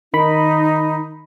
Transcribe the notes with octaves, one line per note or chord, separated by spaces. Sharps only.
D#3 D#4 B5